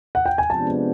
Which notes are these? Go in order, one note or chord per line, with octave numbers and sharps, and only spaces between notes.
F#5
G5
G#5
C3 F3 G#3 B3 D4 A5